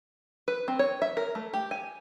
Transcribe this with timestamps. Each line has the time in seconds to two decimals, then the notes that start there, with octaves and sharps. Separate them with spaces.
0.48 B4
0.68 C4
0.79 C#5
1.02 E5
1.17 A#4
1.35 A3
1.53 G4
1.71 G#5